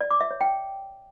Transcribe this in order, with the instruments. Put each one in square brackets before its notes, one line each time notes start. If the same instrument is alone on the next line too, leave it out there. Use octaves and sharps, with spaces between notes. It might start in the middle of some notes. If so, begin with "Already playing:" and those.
[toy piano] D5
D6
E5
C#5
G5